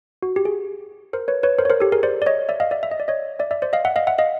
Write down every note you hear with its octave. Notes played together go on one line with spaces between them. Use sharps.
F#4
G4
G#4
A#4 C5
B4 C#5
B4 C#5
A#4 C5
C#5
A#4 C5
G4 A4
G#4 A#4
C5 D5
D5
C#5 D#5
D5 E5
D#5 F5
D5 E5
E5
D#5
D5
C#5 D#5
D5 E5
D5 E5
C5 D5
D#5 F5
E5 F#5
D#5 F5
E5 F#5
D#5 F5